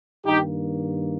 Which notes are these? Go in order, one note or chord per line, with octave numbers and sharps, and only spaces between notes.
G2 D#3 A#3 D#4 G4